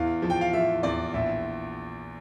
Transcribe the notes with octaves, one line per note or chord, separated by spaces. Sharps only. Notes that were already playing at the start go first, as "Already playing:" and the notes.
Already playing: E2 E3 F5
F3
G5
F5
F3 E5
E2 D5
A#1 E5